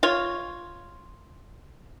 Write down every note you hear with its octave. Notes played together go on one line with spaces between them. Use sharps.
F4 C#5